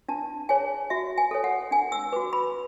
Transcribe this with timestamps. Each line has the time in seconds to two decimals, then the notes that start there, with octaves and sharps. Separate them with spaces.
0.08 D4 A5
0.49 G#4 C#5 G#5
0.90 F#4 E5
1.18 G#5
1.31 A4 C#5
1.44 F#5
1.71 D4 G#5
1.92 E6
2.12 F#4 B4 D6
2.33 B5